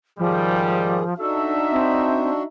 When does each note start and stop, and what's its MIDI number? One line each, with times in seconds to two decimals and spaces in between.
0.19 1.01 44
0.19 1.04 51
0.19 1.14 53
0.19 1.01 55
0.19 1.04 68
1.18 2.43 62
1.18 2.48 63
1.18 2.43 66
1.18 1.53 69
1.18 2.48 76
1.72 2.31 60